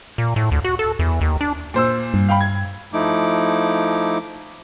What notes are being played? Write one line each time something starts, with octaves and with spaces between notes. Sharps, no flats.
A#2
A2
D2
F#4
A4
E2
D#2
D4
A#2 C5 E6
G2
F5 G5 B5
G#6
F3 A3 D#4 E4 D6